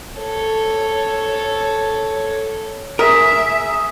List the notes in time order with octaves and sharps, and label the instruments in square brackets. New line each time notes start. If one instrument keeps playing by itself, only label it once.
[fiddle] A4 C#5
[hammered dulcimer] G#4 [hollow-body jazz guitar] A#4 [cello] E5